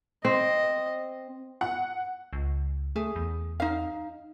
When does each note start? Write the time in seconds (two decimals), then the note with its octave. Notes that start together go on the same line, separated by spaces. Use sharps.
0.25 C4 D#5
1.61 F#5
2.33 C#2
2.96 A3 G#4
3.16 E2
3.60 D#4 F5